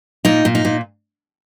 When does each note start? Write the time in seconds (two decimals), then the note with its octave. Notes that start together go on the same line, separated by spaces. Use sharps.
0.25 A#2 D#4
0.45 A#2
0.55 D#4
0.65 A#2